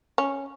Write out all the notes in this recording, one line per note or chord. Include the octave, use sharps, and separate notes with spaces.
C#4